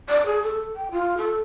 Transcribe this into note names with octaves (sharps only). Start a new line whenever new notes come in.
D5
G#4
A4
G5
F4
A4